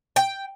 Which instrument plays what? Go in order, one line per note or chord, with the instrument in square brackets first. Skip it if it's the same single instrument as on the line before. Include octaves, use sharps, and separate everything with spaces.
[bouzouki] G5